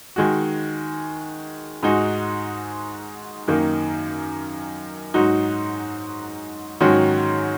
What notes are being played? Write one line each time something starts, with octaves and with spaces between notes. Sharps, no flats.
D#3 G#3 F#4
G#2 G#3 D#4 F#4
F#2 D#3 A#3 D#4
G#2 F#3 D#4 F#4
G#2 D#3 F#3 C#4 F#4